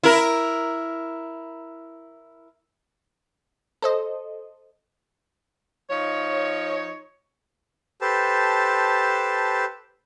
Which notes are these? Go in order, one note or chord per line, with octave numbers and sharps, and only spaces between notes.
E4 A#4
A4 C5 D#5
F3 D#4 C#5
G4 A4 B4 C5 A5